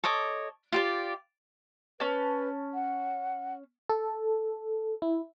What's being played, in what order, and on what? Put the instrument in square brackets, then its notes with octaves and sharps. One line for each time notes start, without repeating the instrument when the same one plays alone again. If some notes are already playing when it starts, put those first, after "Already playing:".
[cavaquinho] A4 C#5 D#5 D6
F4 G4 D5
[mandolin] C#4 A5 [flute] B4
[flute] F#5
[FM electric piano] A4
E4